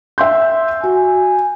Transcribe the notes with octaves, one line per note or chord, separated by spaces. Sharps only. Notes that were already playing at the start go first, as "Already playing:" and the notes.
E5 C6 G6
F#4 G#5